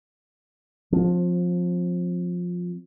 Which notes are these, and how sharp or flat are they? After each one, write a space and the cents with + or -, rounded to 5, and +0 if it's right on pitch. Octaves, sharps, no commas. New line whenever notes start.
F3 +20 C4 +0